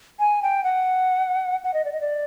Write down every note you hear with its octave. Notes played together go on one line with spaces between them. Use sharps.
G#5
G5
F#5
F#5
D#5
D5
D#5
D5